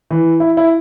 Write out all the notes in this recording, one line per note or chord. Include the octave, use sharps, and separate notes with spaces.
E3
E4
E4